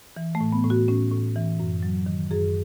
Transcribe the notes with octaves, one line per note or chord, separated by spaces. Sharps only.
E3
A3
A2
B3
A2
F#4
A2 C#4
A2
E3
F#2
F#3
D#3
F#2 G#4